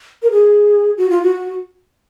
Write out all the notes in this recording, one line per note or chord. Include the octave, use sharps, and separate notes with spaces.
A#4
G#4
F#4
F4
F#4